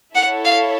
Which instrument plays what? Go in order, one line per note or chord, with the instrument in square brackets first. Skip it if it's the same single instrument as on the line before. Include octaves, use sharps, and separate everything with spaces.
[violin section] E4 A4 C#5 [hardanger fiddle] F#5
[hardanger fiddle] F5